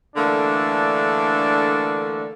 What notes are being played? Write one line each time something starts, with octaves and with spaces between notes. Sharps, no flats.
D3 E3 A3 A#3 D4